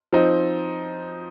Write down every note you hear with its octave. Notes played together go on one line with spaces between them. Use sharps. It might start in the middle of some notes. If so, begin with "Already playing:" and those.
F3 C4 D#4